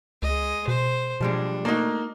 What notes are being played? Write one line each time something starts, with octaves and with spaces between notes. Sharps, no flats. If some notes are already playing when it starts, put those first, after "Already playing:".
C#2 G#3 D#5
B2 C5
B2 F3 G3 G#3 D4
A3 A#3 D#4 F#4